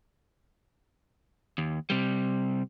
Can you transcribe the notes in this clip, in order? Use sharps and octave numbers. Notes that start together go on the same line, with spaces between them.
D#2
C3 G3